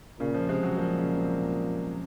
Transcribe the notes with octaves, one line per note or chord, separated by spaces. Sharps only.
A#2 C#3
F3
C3 G#3
F#3
A#2 F3
C#3
C3